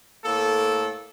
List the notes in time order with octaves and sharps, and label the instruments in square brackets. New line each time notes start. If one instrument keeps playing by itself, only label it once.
[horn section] A2 A#3 A4